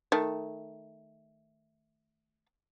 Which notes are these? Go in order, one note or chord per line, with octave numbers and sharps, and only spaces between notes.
D#3 A3